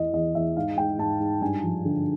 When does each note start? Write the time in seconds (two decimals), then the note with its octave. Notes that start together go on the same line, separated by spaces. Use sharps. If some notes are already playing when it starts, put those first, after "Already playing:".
Already playing: E2 E3 D#5
0.13 E2 D#5
0.35 E2 E5
0.57 G#2 F5
0.77 G#2 G5
0.99 G#2 A5
1.20 G#2
1.41 G2 G#5
1.63 F3
1.85 D3